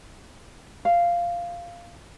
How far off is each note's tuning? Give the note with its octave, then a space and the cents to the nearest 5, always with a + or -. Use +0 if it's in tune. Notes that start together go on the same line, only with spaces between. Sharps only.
F5 -10